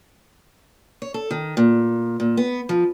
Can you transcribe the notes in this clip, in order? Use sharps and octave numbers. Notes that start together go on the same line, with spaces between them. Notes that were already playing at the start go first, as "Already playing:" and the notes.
C#5
A4
D#3
A#2
A#2
B3
F3